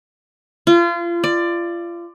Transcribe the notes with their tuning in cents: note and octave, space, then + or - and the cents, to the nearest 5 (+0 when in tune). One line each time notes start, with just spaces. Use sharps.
F4 -30
D5 +15